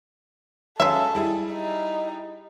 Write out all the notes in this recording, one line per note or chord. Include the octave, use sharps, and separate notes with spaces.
F#3 G#3 C#4 A4 E5 F5
G3 E4 G#4
D#4